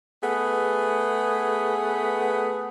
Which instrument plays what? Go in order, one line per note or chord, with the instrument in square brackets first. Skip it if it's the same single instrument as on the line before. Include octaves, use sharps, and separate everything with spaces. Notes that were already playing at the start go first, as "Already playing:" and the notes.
[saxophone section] A3 B3 G#4